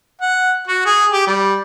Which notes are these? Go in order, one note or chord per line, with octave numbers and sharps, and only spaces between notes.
F#5
F#4
G#4
G4
G3